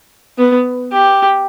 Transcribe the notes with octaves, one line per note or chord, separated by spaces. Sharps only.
B3
G4